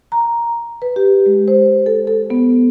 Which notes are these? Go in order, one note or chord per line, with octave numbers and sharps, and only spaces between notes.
A#5
B4
G4
G#3
C5
A4
A4
B3